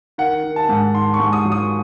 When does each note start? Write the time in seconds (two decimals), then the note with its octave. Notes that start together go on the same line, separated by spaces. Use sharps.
0.18 D#3 F#5
0.44 D#3
0.56 A5
0.69 G#2
0.95 D#3 C6
1.14 C#6
1.20 G#2
1.33 D#6
1.45 F#3
1.52 D#6